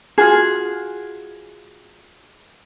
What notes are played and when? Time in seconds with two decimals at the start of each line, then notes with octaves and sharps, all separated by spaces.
0.18 F4 F#4 G#4